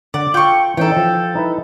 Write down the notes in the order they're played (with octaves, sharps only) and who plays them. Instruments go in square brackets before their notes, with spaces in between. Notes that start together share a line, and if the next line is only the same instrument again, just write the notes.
[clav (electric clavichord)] D3 F#5 [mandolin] D5
[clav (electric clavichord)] F4 A4 [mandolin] G5 C#6
[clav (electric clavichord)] E3 C#4 D#4 [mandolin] A4 G5
[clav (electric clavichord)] F3
D#4 E4 B4